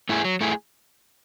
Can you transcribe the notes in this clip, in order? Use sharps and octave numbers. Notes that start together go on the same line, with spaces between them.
A3 E4 G#4
F#3
A3 E4 G#4